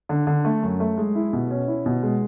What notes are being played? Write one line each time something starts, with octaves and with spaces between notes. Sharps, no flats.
D3
D3
A3
F#2
A3
G#3
E4
B2
C#4
E4
B2
G#3